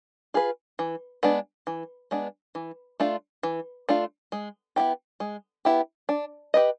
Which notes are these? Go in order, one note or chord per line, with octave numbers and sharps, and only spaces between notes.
F4 G#4 B4
E3
G#3 B3 D4
E3
G#3 B3 D4
E3
A3 D4 F4
E3
A3 D4 F4
G#3
B3 E4 G4
G#3
B3 E4 G4
D4
G4 B4 D#5